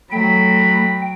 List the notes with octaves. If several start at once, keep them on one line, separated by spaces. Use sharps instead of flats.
F#3 A3 G5 B5